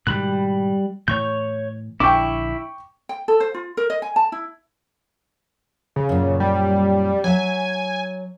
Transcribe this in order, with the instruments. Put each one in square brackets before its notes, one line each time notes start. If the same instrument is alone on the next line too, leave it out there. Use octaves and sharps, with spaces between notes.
[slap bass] G#2 B2 D#3 [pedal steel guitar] G3 B5 F#6
[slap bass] A2 E3 [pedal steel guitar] C#5 C#6 G6
[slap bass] A#1 D3 D4 [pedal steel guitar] E4 [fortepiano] G5 C#6 D6
[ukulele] G5
A4
C5
F4
A#4
D#5
G#5
A5
E4
[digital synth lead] C#3
[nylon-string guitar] F#2 A#2
[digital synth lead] G3
[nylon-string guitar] F#3 E5 [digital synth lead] G#5